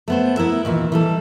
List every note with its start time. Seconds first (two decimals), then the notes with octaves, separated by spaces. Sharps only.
0.08 A3 B3 C5
0.37 B3 E4 A#4 E5
0.65 D#2 A#2 E3
0.92 E3 G3 A4